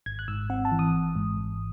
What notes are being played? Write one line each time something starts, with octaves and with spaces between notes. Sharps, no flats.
G#1 G#6
F#6
G#2 E6
C4 F#5
A5
E3
D#6
G#1
G#2
G#1